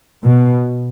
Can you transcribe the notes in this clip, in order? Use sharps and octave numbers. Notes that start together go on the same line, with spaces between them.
B2